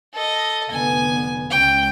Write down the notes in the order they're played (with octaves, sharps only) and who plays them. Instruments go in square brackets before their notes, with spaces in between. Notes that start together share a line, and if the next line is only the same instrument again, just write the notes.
[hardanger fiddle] A4 D#5
[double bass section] F1 D3 B3 [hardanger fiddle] G#5
[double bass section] C#2 C#4 [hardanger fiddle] G5